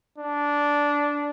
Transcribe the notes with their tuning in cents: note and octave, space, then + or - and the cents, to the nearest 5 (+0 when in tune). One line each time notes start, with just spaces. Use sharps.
D4 -10